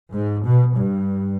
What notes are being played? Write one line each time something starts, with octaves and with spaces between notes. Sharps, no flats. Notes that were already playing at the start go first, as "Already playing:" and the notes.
G#2
B2
G2